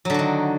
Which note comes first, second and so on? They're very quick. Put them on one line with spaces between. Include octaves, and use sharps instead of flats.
F#3 D3 F#4 D#3